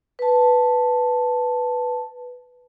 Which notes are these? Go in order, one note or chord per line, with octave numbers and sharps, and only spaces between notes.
B4 A5